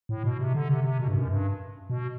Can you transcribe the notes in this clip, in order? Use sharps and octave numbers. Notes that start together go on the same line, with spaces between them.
A2
B2
C3
D3
C3
C3
B2
G2
F#2
G2
B2